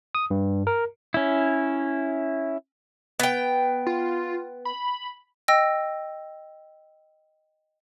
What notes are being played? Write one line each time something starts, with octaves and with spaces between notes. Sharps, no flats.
D#6
G2
A#4
C#4 E4
B3 G5
F4
B5
D#5 G5 E6 A#6